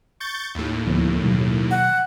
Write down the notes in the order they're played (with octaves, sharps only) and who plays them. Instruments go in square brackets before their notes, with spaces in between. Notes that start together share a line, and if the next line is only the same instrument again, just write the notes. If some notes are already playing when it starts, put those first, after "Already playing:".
[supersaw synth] C#6 G6 A6
D#2 A2
[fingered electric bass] D2 F3 B3
B2 D#3 F#3
[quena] F#5